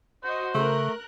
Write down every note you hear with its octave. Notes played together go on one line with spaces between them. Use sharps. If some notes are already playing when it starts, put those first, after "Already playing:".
F#4 C5 D#5
C#3 A3 A#4 F#6